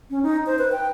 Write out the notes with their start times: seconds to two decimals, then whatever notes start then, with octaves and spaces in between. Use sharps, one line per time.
0.10 C#4
0.23 D#4
0.46 C5
0.59 B4
0.72 G5